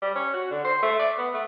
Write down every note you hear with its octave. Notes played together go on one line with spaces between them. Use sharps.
G3
C#4
F#4
D3
C5
A3
D5
B3
A3